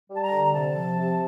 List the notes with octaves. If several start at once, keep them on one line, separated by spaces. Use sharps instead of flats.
G3
A5
A#5
D3
A#5
C3 A5
F3
C3